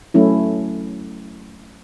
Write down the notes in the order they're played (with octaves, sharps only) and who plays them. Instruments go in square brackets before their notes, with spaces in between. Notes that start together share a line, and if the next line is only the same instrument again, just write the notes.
[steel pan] F#3 A3 C#4 E4